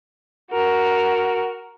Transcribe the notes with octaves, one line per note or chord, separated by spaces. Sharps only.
F#4 A#4